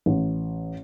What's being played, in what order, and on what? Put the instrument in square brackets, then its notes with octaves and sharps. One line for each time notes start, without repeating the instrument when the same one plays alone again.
[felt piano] A1